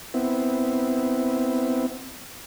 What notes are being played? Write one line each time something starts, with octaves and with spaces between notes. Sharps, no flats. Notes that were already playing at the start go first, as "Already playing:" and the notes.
B3 C4 E4